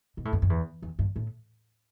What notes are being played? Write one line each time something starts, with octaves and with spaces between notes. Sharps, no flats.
B2
A2
G2
F#2
E2
E2
G2
A2